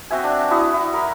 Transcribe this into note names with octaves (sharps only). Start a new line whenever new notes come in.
C4 F#4 E5 G#5
D4
E4 F#4 C#6 D#6
E4
A#4